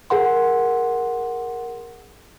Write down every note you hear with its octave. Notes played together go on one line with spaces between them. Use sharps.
G#4 A#4 F#5 C6